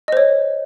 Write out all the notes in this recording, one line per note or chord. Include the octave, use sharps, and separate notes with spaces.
C5 C#5 D#5